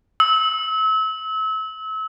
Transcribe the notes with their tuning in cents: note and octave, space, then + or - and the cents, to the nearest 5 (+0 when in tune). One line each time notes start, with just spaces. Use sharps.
E6 -35